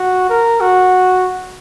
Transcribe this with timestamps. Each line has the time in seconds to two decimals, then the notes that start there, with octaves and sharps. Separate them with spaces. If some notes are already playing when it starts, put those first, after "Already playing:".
Already playing: F#4
0.29 A#4
0.61 F#4